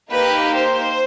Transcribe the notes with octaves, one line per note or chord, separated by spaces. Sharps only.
A#3 D#4 G4 B4
C5